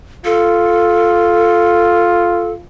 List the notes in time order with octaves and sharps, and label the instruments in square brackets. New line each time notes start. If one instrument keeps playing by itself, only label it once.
[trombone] F4 [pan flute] A4